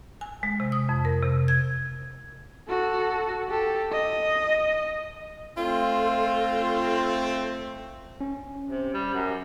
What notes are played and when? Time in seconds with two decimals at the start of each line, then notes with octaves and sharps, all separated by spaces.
0.21 G#5
0.43 G#3
0.60 C3
0.72 D#6
0.89 F2
1.05 A#4
1.23 C3
1.48 G#6
2.68 F#4 A4
3.49 G4 A4
3.92 D#5
5.57 A3 C4 F4 A4
8.21 C#4
8.69 C3
8.93 G3
9.14 F#2